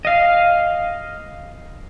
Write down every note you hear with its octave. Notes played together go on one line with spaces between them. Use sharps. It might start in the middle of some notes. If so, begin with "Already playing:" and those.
D#5 F5